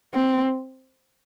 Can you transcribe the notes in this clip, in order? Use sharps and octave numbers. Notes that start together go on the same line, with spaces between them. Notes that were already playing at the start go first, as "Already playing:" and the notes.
C4